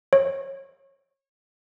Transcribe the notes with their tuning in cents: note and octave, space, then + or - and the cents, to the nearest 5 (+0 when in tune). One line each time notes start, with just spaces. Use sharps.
C#5 -25